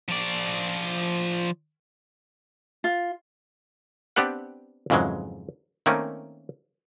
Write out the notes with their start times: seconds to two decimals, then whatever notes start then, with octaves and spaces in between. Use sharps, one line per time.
0.08 F3 D5
2.84 F4
4.16 B3 C4 D4 G4 B4 F#5
4.90 F2 G#2 C#3 E3 F#3 G#3
5.86 D#3 A3 A#3 C4 C#4